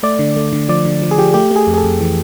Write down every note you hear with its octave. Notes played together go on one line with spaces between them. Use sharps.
A3 D5
D3
A3
D3
F3 D5
D3
F3
G#4
F3 G4
A3 G4
A3 G#4
F2
G#4
A4
F2
E3